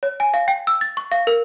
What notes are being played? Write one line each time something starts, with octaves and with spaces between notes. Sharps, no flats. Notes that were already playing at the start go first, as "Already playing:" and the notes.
C#5
G#5
F5
G5
E6
A6
C#6
F5
A#4